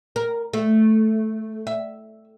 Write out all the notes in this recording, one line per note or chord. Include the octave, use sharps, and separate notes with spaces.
A#4
A3
E5